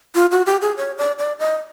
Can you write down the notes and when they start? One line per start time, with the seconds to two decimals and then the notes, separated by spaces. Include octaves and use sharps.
0.15 F4
0.31 F#4
0.46 G4
0.62 G#4
0.77 C#5
0.98 D5
1.18 D5
1.39 D#5